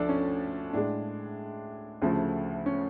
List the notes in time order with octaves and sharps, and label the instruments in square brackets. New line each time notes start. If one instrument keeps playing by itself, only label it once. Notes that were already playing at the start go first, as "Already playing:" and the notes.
Already playing: [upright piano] D2 F3 D4 A4
C#4
A2 G#3 D4
D2 C#3 F3 A3
C#4